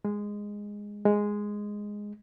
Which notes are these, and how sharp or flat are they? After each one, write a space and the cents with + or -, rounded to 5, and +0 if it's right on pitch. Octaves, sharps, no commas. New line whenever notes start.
G#3 -10
G#3 -5